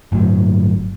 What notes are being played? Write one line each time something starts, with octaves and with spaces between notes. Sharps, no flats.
G1 A2 F#3